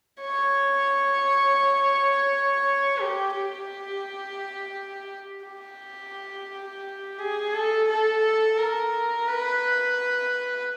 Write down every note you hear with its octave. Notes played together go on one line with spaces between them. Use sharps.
C#5
G4
G4
G4
G#4
A4
A4
A#4
B4